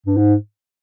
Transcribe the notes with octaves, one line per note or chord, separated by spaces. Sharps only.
G2
G#2